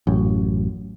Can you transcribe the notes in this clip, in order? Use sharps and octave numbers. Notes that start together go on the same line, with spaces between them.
A1 F#2